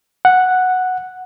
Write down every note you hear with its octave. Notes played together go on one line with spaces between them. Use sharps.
F#5